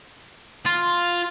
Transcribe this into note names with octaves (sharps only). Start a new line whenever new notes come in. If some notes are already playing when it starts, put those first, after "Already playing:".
F4